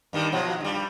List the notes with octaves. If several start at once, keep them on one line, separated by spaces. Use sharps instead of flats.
G2 D#3 G3
B2 F3 F#3
G2 G3